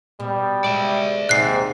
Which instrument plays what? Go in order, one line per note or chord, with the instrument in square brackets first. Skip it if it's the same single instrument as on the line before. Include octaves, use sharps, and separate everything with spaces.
[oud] B2 [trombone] G3
[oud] B2 G#3 [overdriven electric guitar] D5 E5
[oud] D#2 C3 [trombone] G#2 [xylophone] F#6 C7